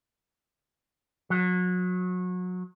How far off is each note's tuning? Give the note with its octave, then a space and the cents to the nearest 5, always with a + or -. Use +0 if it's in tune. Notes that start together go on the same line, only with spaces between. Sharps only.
F#3 -30